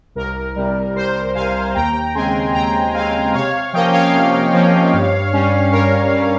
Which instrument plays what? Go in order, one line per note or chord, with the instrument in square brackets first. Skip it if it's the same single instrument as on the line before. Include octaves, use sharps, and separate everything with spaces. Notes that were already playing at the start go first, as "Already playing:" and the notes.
[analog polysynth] C2 A#4
C3 G3
C2 C5
C3 G3 F5 G#5
D#2 G5 A#5
C#3 G#3 C4 G#5 C6
D#2 G5 A#5
C#3 G#3 C4 F5 G#5
C3 C#5 F5
F3 A#3 C#4 D#5 G5
C#5 F5
C3
F3 A#3 C#4
G2
G3 C#4
G2 A#4 C#5
G3 C#4